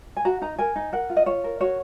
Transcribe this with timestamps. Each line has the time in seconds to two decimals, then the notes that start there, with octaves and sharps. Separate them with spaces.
0.17 G#5
0.25 F#4 A#5
0.42 D#4 A#5
0.59 A#4 G#5
0.76 D#4
0.92 A#4 F#5
1.10 F4
1.17 D#5
1.26 F4 C#5
1.44 A#4
1.60 F#4 C#5